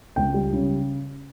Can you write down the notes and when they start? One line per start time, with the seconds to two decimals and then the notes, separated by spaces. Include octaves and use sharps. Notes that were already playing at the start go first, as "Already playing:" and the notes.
0.16 C#2 G5
0.34 G3
0.53 C#3